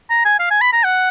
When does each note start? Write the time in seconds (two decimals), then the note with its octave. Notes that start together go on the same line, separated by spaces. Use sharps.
0.10 A#5
0.25 G#5
0.39 F5
0.51 G#5
0.61 B5
0.73 A#5
0.84 F#5